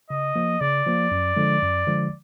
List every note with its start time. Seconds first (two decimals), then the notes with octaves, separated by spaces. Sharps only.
0.10 C#3 D#5
0.36 F3 A#3
0.60 C#3 D5
0.87 F3 A#3
1.11 F#2
1.36 D3 F3 G#3
1.62 F#2
1.87 D3 F3 G#3